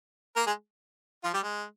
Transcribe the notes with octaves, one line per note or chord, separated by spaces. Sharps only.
A#3 A#4
G#3 G#4
F3 F4
G3 G4
G#3